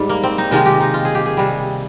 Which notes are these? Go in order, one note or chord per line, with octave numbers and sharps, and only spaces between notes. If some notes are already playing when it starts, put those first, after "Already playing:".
Already playing: G#2 G3
A#3
C4
D#4
C3 D#3 G#3 F4
G4
D#4
F4
G#4
G4
G#4
C3 G3